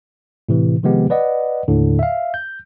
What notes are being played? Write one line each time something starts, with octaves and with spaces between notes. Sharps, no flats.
A2 C3 E3
C3 D#3 F3 G#3 B3 G4
B4 D5 D#5 F#5
D#2 A2 D3
E5 F5
G6